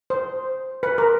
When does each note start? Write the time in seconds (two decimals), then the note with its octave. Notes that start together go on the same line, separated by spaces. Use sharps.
0.10 C5
0.83 B4
0.98 A#4